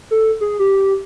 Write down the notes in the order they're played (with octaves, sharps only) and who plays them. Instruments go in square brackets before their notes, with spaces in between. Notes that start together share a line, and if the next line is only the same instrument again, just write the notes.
[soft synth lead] A4
G#4
G4